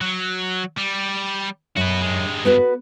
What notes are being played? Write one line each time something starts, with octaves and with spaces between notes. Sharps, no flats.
F#3
G3
F#2 F#4 B4
G2 G#3
B3 F#4 B4